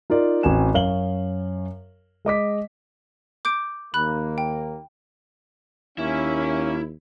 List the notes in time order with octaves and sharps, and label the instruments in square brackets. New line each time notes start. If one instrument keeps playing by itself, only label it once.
[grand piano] D#4 F4 A#4 D5
A1 C4 F#4 G#5 E7
F#2 C#5 F5 F#7 G7
G#3 D#5 D6 B6
[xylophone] D6 G6 D7
[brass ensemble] D#2 A#3 [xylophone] B5 F#6
[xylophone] G5
[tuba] D#2 [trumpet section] A#3 C#4 [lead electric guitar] E4